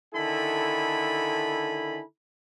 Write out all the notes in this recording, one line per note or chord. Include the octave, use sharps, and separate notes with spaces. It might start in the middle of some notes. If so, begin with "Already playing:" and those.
D3 D#3 E4 A4 G#5 B5